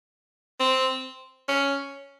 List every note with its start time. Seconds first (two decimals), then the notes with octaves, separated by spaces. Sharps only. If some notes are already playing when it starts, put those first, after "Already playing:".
0.60 C4
1.49 C#4